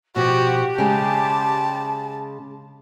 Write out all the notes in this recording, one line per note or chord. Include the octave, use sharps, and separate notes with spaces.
B2 F3 F#4 G4
C#3 G#3 A5